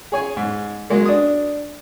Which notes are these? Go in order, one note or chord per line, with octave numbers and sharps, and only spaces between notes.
G#4 C#5 G#5
G#2
F#3 G#3 A#3
D4 D#6